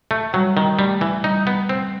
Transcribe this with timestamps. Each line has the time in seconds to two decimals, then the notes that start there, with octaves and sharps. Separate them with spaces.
0.11 A3
0.33 F#3 G3
0.57 D#3
0.78 G3 A3
1.01 E3
1.24 G3 D#4
1.47 B3
1.69 C4